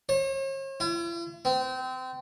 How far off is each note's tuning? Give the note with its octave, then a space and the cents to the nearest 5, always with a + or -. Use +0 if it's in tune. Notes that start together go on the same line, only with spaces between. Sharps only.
C#5 -45
E4 +45
C4 -25